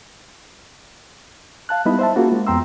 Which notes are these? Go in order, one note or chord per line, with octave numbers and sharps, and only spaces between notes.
F5 A5 F#6
G3 B3 D#4 E4 D#5 B5
C5 E5 A5
A#3 C#4 F4 F#4 G#4
G#3
F2 B3 G5 A#5 C6 E6